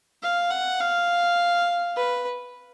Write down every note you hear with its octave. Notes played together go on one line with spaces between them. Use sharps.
F5
F#5
F5
B4